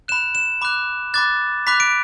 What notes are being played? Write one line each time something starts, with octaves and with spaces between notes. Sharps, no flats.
B5 F#6 E7
E7
B5 D6 F#6
B5 D6 F#6 A6
B5 D6 F#6 B6
D7